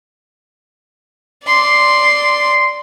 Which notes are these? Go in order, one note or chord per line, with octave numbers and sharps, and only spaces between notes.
D5 C6